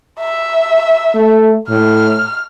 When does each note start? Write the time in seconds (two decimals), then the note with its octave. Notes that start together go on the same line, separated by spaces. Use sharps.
0.20 E5
1.15 A3
1.70 A2 F6